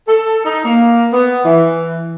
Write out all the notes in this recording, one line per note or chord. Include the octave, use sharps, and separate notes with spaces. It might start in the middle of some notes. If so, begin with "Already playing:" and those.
A4
D#4
A#3
B3
E3